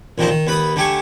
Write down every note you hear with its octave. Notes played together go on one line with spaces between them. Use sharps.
A1 A#2 D#3 F3 D#4 C5
D#3
D#2 B4 B5 D#6
D3 A3 G4 G#5 C#6